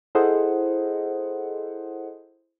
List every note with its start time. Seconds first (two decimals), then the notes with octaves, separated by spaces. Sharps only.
0.15 E4 G#4 A4 C5 D#5 F#5